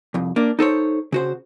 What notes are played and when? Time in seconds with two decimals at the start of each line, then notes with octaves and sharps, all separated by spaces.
0.14 C2 F2
0.36 A#3 D4
0.59 D#4 A4 C5 C#5
1.12 C#3 F#4 C5